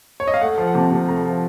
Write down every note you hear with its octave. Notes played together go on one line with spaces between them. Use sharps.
C#5
D#5
F5
A3 F#5
F3
F#5
C3 A5
C3
A3 A#5
F3